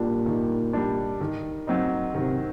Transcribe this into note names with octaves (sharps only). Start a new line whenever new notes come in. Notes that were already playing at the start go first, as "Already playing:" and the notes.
Already playing: A#2 G3 D4
D#3
G3 D4
D#3
F#3 C4 D#4
C3 D#3